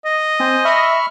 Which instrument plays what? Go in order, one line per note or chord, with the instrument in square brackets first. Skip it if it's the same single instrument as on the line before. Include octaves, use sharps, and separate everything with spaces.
[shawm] D#5
[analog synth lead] C4 [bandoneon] C5 G#5
[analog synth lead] E5 [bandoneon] B5 C#6 F6